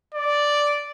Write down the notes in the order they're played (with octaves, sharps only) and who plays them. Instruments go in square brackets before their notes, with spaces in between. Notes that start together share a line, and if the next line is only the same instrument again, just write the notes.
[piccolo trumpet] D5